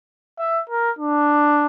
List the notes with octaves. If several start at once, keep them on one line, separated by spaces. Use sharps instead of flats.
E5
A#4
D4